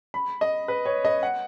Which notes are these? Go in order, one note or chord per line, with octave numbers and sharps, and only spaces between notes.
B5
D#5
B4
C#5
D#5
F#5